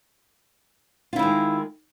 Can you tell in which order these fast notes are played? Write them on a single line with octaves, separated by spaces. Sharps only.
F4 E4 D#3 G#3